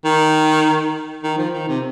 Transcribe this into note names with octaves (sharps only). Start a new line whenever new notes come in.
D#3
D#3
F3
D#3
C3